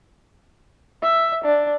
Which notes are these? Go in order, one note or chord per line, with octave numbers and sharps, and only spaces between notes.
E5
D4